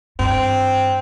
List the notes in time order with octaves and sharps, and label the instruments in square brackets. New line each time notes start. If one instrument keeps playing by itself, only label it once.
[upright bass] G2 [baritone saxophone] C4